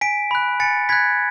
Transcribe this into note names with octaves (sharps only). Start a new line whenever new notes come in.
G#5 B6 D7
B5 F#6
G#5 A6 C#7
B5 F#6 G#6 B6